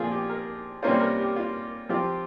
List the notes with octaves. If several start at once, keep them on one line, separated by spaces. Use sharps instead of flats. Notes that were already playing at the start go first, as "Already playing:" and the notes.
Already playing: A#2 F3 C4 F4 G#4 A#4
G4
A#4
C3 G3 A#3 C#4 F4 C5
A#4
G4
F4
F3 C4 F4 G4